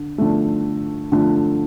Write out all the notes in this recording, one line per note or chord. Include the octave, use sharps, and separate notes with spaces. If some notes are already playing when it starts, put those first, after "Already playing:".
Already playing: D3
D3 F3 A3
D3 F3 A3